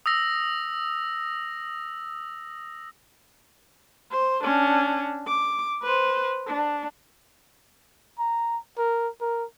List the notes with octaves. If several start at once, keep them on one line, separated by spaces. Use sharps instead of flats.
D#6 E6 A#6
C5
C#4 D4
D6
B4 C5
D4
A#5
A#4
A#4